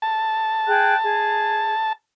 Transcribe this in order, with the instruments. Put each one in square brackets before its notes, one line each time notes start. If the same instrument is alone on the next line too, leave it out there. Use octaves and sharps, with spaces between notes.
[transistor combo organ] A5
[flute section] G#4 G5 F#6
G#4